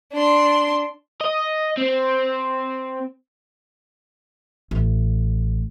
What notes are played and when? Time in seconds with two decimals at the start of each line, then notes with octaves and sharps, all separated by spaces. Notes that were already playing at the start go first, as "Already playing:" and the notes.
0.13 D4 C6
1.21 D#5
1.78 C4
4.71 A1